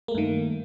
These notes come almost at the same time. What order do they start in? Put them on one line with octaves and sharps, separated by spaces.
A#3 A3 G2 D#3